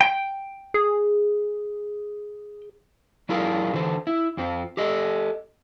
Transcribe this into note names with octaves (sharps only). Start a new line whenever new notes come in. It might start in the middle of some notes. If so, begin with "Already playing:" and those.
G5
G#4
F#3 D4 E4 F4 G#4 A#4
D3 E3 C5
E4
F2 F3 C4
G4 A4 D#5